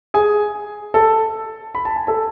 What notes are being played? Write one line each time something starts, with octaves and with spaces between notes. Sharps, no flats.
G#4 G#5
A4 A5
B5
A5
G#5
A4 A5